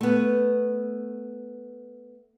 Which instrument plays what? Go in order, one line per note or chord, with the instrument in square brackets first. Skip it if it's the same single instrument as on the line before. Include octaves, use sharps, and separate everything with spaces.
[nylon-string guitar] A3 B3